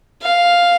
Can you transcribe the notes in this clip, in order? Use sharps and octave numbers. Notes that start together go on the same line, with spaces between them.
F5